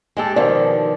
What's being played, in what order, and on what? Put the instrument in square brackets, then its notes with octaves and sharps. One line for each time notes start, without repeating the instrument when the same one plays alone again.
[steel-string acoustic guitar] G#3 G4 A4
[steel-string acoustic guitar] B2 D#3 F3 [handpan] D5